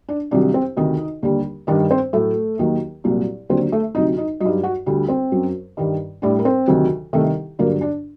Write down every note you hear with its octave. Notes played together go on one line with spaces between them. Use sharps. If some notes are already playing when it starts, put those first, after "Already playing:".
D4 D5
C2 C3 D#3 F#3 D4 D5
C4 C5
D2 C3 D#3 D#4 D#5
D#2 D3 G3
G2 D#3 G3 D4 D5
C4 C5
A2 F#3 A3 A4
D#2 D#3 F#3
C2 A#2 F#3
D#2 D3 F#3 C4 C5
A3 A4
D2 C3 F#3 D#4 D#5
D#4 D#5
F#3 D#4 D#5
G2
F#4 F#5
D2 D3 G3
C4 C5
F#2 F#3
G2 D#3 G3
A2 G3 D4 D5
A#4
C4 C5
D2 C3 D#3 F#3
C2 C3 D#3 A3 A4
G2 D3 F#3 A#3 A#4
D4 D5